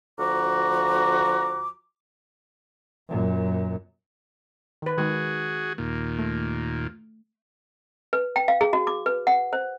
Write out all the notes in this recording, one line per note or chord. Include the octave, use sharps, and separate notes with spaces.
D2 F3 F#4 A#5 D6
F#2 A#2
D#3 B4
D#3 G#3 F#4 G#4
D#2 A#2
A3
B4
G5
F5
G#4
F#4
D6
B4
F#5
C5